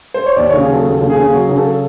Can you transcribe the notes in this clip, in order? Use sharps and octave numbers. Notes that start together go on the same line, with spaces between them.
C5
C#5
D#2 D5
C#3 C#5
G#4
F#3 A4
D#2 A4
C#3
G#4
C#3
F#3
C#3 G#4
A4